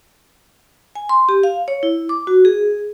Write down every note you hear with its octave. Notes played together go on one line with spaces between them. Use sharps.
G#5
C6
G4
F5
C#5
E4
D6
F#4
G#4